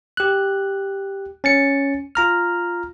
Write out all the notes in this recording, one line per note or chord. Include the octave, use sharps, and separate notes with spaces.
G4 F#6
C#4 A6 C#7
F4 A#5 F6